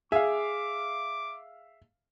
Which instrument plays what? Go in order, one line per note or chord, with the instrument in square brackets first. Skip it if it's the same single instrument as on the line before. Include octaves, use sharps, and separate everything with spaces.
[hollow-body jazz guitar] G#4 [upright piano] E5 F5 [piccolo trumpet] D6